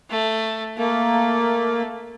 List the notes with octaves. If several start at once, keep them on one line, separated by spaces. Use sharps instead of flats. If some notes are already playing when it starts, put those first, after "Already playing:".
A3
A3 A#3